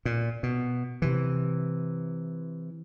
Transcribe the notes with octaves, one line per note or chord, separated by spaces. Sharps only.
A#2
B2
C3 E3